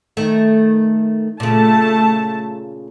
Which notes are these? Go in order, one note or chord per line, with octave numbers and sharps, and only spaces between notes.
D#3 A3
A#2 C#3 A3 A5